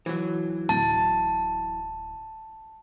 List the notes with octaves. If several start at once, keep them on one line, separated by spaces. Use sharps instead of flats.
E3 F#3
D1 A5